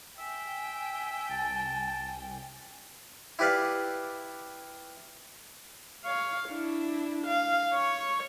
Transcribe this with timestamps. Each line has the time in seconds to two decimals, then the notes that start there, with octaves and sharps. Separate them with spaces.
0.19 E5 G5 G#5
1.29 C2 A5
3.39 E4 G4 B4 D5 F5
6.05 C#5 F5
6.49 D4 E4
7.27 F5
7.74 C#5 C#6